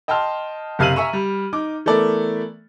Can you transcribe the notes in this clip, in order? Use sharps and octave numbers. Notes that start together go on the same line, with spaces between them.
D#5 G5 A5 C6 F6
F#1 C3 F5 F6 D#7 F#7
E5 G#5 A#5 C#6 E6
G3
D#4 D6
E3 A3 B3 A4 A#4 D5